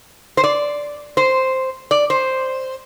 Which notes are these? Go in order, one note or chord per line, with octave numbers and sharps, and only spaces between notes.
C5
D5
C5
D5
C5